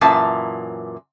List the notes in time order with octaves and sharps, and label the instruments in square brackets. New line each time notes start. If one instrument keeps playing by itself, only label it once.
[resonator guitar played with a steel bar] F#2 A#2 E3 A5